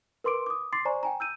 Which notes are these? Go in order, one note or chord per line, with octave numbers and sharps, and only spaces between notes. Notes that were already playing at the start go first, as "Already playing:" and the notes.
A#4 B4 C6 D6 D7
D6 D#6
C6 D6 A6 C7
C5 D5 G#5 A#5 C#6
G5 G#5 A#5
E6 G6 D#7